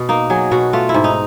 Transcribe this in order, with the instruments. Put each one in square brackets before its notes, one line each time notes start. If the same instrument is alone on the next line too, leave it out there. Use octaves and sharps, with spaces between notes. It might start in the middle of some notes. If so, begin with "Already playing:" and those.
Already playing: [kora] B2
A#3 D#4
F#3 G#4
B2 F#4
A3 F4
E4
G#2
D#4